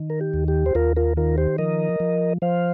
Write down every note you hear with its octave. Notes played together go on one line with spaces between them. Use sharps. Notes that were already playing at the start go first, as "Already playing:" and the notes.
Already playing: D#3
A#4
G4
D#2
G4
C5
D#2 F4 A#4
F4 A#4
D#3 F4 A#4
G4 C5
F3 A#4 D#5
F3
F3 C5 F5